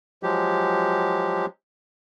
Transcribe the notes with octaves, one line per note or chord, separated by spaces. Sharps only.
F3 F#3 G#3 G4